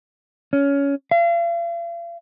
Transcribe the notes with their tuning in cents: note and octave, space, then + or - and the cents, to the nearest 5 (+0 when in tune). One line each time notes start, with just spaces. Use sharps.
C#4 +20
F5 -40